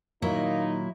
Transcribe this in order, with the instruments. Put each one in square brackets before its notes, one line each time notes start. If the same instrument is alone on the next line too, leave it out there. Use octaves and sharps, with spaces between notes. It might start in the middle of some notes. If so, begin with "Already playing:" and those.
[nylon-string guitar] A#2 D#3 [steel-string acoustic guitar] F#3 E4 [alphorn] A#3 [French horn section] D#4